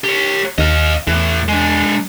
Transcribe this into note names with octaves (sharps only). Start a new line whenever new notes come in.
G4 C#5
D#2 D#5 F5
E2 A2 E3
G#3 D4